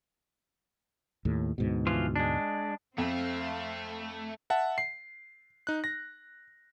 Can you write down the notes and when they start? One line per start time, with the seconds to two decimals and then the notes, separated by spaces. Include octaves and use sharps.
1.25 D#2 A2
1.58 D2 G#2 B2
1.87 E3 F3 F4
2.16 G#3 D4
2.98 F2 A3 C4 F5
4.50 E5 F#5 A5
4.78 C7
5.67 D#4 F#6
5.84 A#6